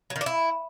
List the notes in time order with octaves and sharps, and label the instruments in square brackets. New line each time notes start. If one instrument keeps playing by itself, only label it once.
[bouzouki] F#3
D#3
D4
E4